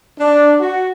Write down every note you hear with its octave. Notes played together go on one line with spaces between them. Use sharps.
D4
F#4